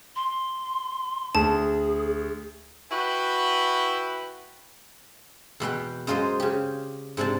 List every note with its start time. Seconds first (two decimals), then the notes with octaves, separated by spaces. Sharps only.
0.16 C6
1.35 D2 G#4 A5
2.92 E4 F#4 B4 G5
5.60 E2 B2 B4 G5
6.07 F#2 G#3 F4 C5 D#5
6.40 C#3 G4
7.17 G#2 C3 D4 A5